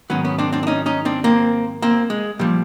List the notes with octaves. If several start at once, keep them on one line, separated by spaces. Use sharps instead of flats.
G#2 D#3 F#3 B3 C#4
B3 C#4
C4 D4
C4 D4
D4
C#4 D#4
C#4 D#4
C4 D4
A#3 C4
A#3 C4
G#3
A#2 F3 G3